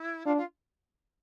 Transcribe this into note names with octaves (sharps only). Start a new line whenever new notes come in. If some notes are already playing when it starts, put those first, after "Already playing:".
Already playing: E4
D4 F4
F4